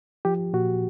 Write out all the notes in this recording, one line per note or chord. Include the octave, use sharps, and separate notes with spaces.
F3 G4
A#2 F#4